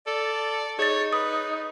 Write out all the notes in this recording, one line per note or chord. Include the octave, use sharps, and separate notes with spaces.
A4 D5
D#4 G#4 C#5 A6
B4 D#6